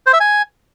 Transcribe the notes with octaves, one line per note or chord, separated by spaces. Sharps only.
C5
E5
G#5